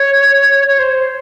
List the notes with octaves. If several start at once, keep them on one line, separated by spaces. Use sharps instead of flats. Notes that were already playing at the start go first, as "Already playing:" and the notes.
Already playing: C#5
C#5
C5